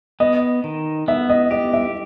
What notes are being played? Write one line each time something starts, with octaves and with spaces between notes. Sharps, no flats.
B3 D#5
D#3
B3 E5
D#5
G4 D#5
E5